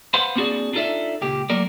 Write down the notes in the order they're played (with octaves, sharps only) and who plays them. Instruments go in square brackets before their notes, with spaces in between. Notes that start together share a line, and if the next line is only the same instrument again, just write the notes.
[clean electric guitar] B4 C5 F5 F#5 B5 C6
A#3 C4 D4 F#4 G#4 D5
D4 D#4 F4 A4 D5 E5
C#2 A#2 G4
F#3 A3 A#3 A#4 D5